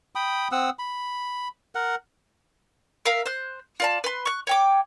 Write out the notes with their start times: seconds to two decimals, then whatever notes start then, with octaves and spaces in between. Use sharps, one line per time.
0.15 G5 B5 D#6
0.52 C4 F#5 D#6 E6
0.79 B5
1.75 A#4 F#5
3.05 A#4 E5 F5 A#5
3.26 C5 F#6
3.80 F4 D5 A5
4.04 B4 C6
4.25 C#6 F#6
4.47 C#5 G5 D6